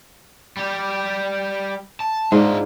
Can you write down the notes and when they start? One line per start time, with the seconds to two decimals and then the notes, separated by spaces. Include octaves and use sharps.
0.57 G3 G4
2.00 A5
2.32 G#2 D4 D#4 F4